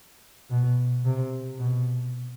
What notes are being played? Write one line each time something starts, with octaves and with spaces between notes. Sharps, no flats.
B2
C3
B2